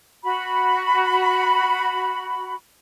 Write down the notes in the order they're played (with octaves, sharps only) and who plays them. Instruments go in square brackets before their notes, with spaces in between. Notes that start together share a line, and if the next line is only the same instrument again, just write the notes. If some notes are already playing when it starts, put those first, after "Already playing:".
[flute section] F#4 B5